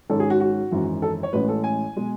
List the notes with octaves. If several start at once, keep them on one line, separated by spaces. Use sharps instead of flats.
G#2 D#3 G#3 C#4 A4
G#4
F#4
F#4
G#1 F#2 E3
A4
C#5
A1 A2 G#3 C#4 B4
A4
G#5
B2 G#3